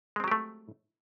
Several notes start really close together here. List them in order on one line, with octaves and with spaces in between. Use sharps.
G#3 C4 F#3 G4 A3